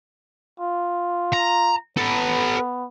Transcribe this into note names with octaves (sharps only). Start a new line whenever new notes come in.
F4
A#5
B3 A4 B4